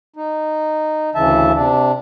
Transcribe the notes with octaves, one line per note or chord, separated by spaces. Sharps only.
D#4
D2 C#3 E3 E5 A5
C3 D4